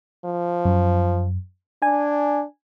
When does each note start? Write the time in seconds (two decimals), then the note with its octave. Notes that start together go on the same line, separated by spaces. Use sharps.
0.25 F3
0.65 F#2
1.82 D4 G#5